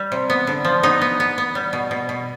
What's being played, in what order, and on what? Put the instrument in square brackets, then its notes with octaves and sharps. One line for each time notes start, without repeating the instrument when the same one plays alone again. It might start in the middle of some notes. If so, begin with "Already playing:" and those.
Already playing: [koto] G3
C3
B3
D3
F3
B3 D#4
B3
B3
B3
G3
B2
B2
B2